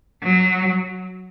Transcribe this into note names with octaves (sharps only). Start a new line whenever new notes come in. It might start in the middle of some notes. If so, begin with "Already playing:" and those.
F#3